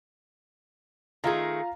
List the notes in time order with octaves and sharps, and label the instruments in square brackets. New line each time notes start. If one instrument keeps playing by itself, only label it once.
[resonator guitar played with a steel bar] D#3 A3 G#4 [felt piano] F4 F5 A#5